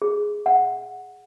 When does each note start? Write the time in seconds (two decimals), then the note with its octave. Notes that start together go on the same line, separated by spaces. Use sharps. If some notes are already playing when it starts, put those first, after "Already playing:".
0.02 G#4
0.46 F#5